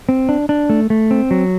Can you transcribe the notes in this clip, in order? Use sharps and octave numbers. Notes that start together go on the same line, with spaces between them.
C4
D4
D4
A3
A3
C4
F#3